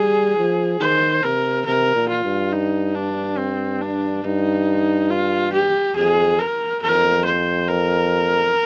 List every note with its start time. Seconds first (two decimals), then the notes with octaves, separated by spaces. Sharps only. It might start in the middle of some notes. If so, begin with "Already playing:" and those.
Already playing: G3 G#4
0.37 F3
0.80 D#3 C5
1.23 C3 A#4
1.66 C3 A#4
1.95 A#2
2.09 F4
2.24 G2
2.52 D#4
2.95 D4
3.38 C4
3.81 D4
4.24 G2 D#4
5.10 F4
5.53 G4
5.96 F2 G#4
6.39 A#4
6.82 F2 A#4
7.25 C5
7.68 A#4